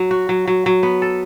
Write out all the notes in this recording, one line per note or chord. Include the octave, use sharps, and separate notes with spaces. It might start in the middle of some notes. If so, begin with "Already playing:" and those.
Already playing: F#3
F#4
F#3
F#3
F#3
B3
A4